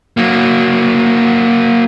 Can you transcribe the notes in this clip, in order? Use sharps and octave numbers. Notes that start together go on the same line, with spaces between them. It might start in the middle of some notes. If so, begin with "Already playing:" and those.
F#3 A#3